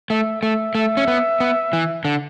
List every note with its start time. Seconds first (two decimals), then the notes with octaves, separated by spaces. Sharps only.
0.10 A3 E5
0.42 A3 E5
0.75 A3 E5
0.97 C#4
1.08 B3
1.40 B3
1.73 E3
2.05 D3